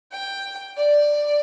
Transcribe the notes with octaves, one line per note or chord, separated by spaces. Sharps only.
G5
D5